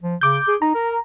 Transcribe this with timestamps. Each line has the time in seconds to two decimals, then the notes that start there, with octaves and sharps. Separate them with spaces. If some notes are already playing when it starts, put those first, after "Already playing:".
0.02 F3
0.21 C#3 D6 G6
0.47 G#4
0.62 D#4 A#5
0.75 A#4